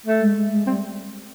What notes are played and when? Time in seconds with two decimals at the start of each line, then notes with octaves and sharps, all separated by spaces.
0.06 A3
0.21 G#3
0.36 G#3
0.52 G#3
0.67 G3 C4